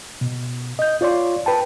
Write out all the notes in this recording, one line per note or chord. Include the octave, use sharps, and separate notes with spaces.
B2
D#5 G6
F4 C#5 D5 C6
B4 G5 A5